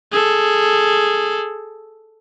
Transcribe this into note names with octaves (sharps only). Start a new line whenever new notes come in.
G#4 A4